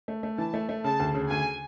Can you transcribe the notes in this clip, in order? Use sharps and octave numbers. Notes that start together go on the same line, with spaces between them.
A3
A3
E3 A5
A3
A3
C#3 A5
D2
C#3
D2 G#5